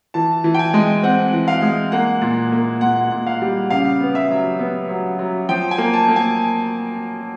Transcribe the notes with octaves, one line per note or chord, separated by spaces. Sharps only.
E3 A5
E3
G5
G#5
G#3
C4 F#5
E3
F5
G#3
A#3 F#5
A#2
A#3
A#2 F#5
A#2
F5
G3
C#3 F5
B3
E5
F#3
B3
F#3
F#3
F3 G5
G#5
A#3
A5
A#3
G#5